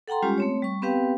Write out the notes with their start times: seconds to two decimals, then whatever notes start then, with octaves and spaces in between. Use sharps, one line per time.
0.08 A4 F#5 G5 A#5 C6
0.23 G3 G#3 C#4 F4 G4
0.38 A3 C4 C#5
0.62 G3 C#6
0.82 B3 C4 G4 B4 F5 G5